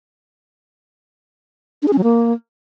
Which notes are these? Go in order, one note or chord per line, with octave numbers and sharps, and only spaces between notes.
D4
G#4
C#4
F#3
A#3